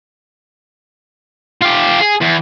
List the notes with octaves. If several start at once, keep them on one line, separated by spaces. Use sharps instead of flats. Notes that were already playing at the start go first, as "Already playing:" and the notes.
F4 G4
G#4
E2